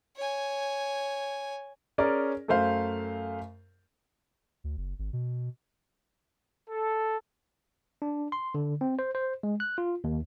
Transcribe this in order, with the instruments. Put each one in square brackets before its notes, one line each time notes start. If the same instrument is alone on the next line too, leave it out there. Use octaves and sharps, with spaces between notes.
[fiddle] C#5 G#5
[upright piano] C#4 G#4 A#4 D5
F#2 A3 C5 F5
[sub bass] D2
F#1
G#1
B2
[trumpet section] A4
[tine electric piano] D4
C6
D3
C4
C5
C5
G#3
F#6
F4
D#2